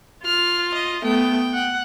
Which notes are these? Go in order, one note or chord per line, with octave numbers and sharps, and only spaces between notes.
F4 F6
D#5
A3 B3 G5
F#5